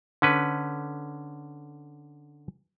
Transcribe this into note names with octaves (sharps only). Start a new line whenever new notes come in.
D3 C#4 B4